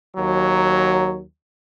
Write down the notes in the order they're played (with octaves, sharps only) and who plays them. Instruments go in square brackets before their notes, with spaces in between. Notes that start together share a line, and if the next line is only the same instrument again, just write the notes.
[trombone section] D#2 F#3